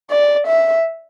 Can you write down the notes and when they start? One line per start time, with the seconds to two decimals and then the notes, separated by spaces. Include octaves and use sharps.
0.11 D5
0.47 E5